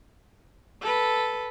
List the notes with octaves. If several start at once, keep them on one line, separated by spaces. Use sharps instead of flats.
A4 B4